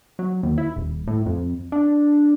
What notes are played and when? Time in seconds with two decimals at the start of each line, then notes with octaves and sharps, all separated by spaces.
0.19 F#3
0.43 D#2
0.58 E4
0.76 D#1
1.08 A2
1.26 F2
1.72 D4